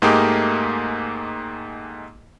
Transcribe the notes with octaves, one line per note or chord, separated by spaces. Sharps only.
G#2 A3 A#3 D#4 G4 G#4